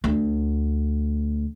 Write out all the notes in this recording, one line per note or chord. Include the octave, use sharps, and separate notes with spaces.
D2